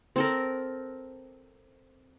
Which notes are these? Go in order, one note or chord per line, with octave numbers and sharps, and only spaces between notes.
C4 A4 A#4